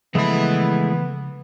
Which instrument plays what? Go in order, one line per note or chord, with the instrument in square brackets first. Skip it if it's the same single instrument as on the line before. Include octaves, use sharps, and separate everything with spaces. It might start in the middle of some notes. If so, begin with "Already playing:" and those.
[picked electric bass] C#3 F3 [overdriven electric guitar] E3 B5 [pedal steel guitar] G#3 A3 E4 [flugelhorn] B3